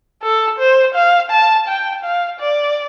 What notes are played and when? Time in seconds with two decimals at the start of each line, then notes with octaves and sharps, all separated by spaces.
0.23 A4
0.59 C5
0.95 F5
1.31 A5
1.67 G5
2.04 F5
2.40 D5